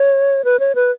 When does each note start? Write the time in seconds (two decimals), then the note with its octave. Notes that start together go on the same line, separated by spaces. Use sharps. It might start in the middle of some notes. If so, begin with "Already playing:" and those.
Already playing: C#5
0.45 B4
0.60 C#5
0.75 B4